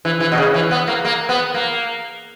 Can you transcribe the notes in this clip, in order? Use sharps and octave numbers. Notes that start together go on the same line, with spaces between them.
E3
E3
B2
C#3
E3
B3
A#3
A#3
B3
A#3